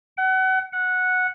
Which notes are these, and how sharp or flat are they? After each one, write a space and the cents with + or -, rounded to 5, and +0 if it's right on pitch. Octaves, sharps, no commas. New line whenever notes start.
F#5 +30
F#5 -10